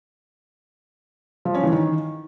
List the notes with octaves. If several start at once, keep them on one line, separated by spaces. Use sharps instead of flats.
F3
C#4
E3
D#3